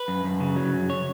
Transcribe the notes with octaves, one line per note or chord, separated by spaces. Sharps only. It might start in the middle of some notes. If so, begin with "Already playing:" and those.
Already playing: B4
F#2
F#2
C#3
F#3
F#2
C#5